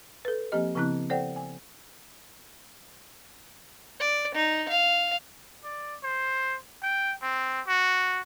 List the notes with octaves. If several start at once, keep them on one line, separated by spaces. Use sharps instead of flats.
A4 B4
F3 A#3 C4 G4 D#5
C#3 F3 B3 C4 E4 F#6
A4 C5 D5 F#5 G5
G#5
D5
D#4
F5
D5
C5
G5
C4
F#4